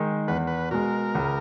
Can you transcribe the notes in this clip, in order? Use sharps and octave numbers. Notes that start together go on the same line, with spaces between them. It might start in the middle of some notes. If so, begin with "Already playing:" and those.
Already playing: D#3 G#3 D#4
E2 B4
B4
B2 G#3 A#4
C#2